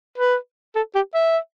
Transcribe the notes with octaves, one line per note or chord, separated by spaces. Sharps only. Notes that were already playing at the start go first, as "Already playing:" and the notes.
B4
A4
G4
E5